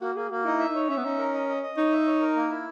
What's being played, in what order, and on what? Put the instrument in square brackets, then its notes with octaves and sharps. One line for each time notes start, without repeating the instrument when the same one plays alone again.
[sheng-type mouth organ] A#3 [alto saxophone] F#4
[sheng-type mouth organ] A#3 [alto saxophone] G#4
[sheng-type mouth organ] A#3 [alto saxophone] F#4
[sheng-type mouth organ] D#4 [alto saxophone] E4
[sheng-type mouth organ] E5
[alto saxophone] D#4
[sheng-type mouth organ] C#5
[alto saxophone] C#4 [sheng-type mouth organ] E5
[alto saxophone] B3
[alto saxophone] C#4 [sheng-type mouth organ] D#4
[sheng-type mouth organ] A#4
D#5
D#5
D#5
[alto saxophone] D#4 [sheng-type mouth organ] C#5
[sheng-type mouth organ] E5
C#5
A#4
A#3
E4